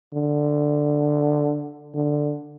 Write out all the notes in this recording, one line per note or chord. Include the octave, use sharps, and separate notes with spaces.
D3
D3